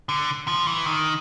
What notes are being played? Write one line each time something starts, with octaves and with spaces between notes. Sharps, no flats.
D3
F3
E3
D#3